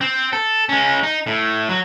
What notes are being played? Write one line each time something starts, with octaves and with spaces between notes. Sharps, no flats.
C4
A4
G#3 C#4
D#4
A2
F#3